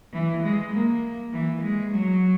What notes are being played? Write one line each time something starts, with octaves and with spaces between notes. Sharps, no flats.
E3
G#3
A#3
E3
G#3
F#3